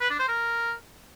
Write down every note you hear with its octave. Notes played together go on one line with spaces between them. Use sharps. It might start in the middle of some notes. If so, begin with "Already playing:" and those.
B4
D4
C5
A#4